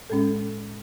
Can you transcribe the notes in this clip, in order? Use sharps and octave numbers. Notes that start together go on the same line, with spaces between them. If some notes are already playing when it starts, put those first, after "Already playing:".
A2 G#3 C#4 A4